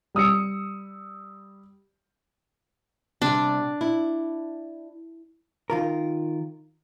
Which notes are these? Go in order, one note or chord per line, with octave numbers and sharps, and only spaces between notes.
G3 D#6 E6 C#7
C3 G3 D4
E4
D#3 F4 A#4